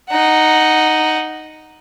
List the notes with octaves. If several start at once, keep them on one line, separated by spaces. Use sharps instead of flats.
D#4 F#5